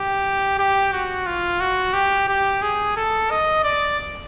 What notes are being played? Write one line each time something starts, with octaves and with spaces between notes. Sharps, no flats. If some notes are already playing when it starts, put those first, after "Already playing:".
Already playing: G4
G4
F#4
F4
F#4
G4
G4
G#4
A4
D#5
D5